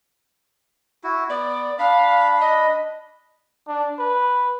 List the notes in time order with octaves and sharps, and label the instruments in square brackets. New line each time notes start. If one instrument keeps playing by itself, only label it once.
[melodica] E4 F#4
[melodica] B3 [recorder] D5
[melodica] D4 B5 [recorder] F5
[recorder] D#5
[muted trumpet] D4
B4